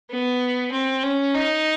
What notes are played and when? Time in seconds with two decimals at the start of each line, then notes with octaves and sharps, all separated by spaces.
0.11 B3
0.72 C4
1.03 C#4
1.34 D#4